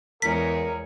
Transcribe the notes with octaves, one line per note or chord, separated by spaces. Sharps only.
E2 G#3 A#4 C#5 B6